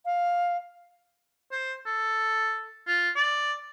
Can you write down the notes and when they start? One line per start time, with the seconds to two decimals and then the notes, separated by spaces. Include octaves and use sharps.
0.05 F5
1.52 C5
1.86 A4
2.87 F4
3.16 D5